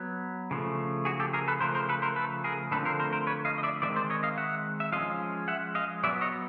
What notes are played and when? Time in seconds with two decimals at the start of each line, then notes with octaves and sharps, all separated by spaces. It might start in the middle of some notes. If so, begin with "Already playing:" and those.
Already playing: F#3 B3
0.51 C#3 F3 A3
1.05 F#4 G#4
1.20 G4 A4
1.33 G#4 A#4
1.48 A4 B4
1.61 C#3 F3 A3 A#4 C5
1.74 A#4 C5
1.89 A4 B4
2.02 A#4 C5
2.16 A4 B4
2.44 G#4 A#4
2.71 D3 F3 A3 C4 A4 B4
2.85 A#4 C5
3.00 A#4 C5
3.13 A#4 C5
3.27 B4 C#5
3.45 D#5 F5
3.58 D#5
3.63 D5 E5
3.82 D#3 G#3 C4 D5 E5
3.96 C5 D5
4.10 C#5 D#5
4.23 D#5 F5
4.38 E5 F#5
4.80 E5
4.92 F3 G#3 C#4 D#5 F5
5.48 E5 F#5
5.75 D#5 F5
6.03 F#3 B3 D5 E5
6.21 C#5 D#5